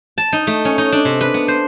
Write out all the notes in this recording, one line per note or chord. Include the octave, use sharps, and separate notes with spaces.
A5
D#4
A3
C#4
D#4
D4
C3
B4
B3
C5